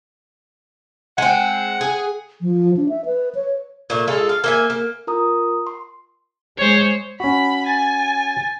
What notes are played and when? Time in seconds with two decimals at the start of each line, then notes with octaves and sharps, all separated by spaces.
1.18 G#3 C4 F#5
1.81 G#4
2.42 F3
2.77 D4
2.89 E5
3.06 B4
3.35 C#5
3.90 A#2 A3
4.07 G#3 F4 A4
4.29 F5
4.44 A#3 E5 G#5
4.70 A#3
5.07 F4 A#4 A#5 D#6
5.67 C6
6.58 G#3 C5 C#5
7.20 C#4 F#4 B5
7.66 G#5 A6